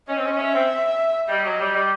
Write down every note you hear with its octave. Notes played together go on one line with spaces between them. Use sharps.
C#4 D#5
C4
C#4
C#4 E5
C4
G3 D#5
F#3
G3
G3